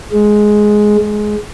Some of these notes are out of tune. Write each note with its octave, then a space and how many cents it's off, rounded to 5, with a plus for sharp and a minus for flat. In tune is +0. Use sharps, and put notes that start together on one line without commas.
G#3 +10
G#3 +15